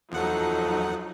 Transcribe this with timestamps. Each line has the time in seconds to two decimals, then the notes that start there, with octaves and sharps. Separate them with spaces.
0.12 E2 F3 F#3 D#4 A4 F#5